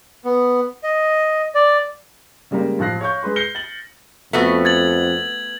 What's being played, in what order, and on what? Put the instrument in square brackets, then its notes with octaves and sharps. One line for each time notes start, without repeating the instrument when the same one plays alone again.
[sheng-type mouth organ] B3
D#5
D5
[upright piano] C#3 G3 G#3 A#3
A1 F3 F5 F#6 A#6 C7
C#5 F5 C#6 G6
G#3 G#4 B4 C6
F6 G6 A#6 C7 C#7 G7
A6 F#7
[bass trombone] F2 [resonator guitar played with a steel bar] A3 B3 F#4
[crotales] G#6 A6 F#7